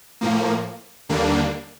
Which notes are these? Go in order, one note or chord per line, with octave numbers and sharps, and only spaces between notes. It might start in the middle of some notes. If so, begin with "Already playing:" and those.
A2 F3 A#3
D#2 D3 G3 A#3 D4